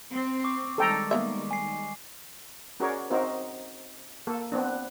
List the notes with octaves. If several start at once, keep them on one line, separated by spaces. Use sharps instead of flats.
C4
C#6 D6
D#3 G3 G#3 A4 G5 A#5
A#3 B3 E5
G#5 C7
C#4 F#4 G#4 A#4 C#5 D5
C4 D#4 F#4 A#4 C5
A#3 A4
B3 C4 D4